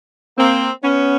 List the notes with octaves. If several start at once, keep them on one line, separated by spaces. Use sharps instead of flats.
A#3 C4
B3 C#4